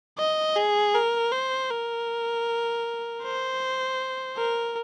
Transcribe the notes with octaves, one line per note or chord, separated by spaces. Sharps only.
D#5
G#4
A#4
C5
A#4
C5
A#4